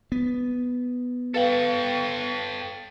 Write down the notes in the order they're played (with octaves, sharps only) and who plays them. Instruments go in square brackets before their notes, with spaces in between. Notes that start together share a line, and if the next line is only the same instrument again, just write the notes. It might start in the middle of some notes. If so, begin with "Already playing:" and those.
[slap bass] B3
[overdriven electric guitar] A4 G5 [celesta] B4 F5 F#7